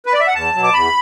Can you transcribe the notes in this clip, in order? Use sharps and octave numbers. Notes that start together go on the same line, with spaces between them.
B4
D5
E5
F#5
E2 A5
B2 F#3
D6
E2 B5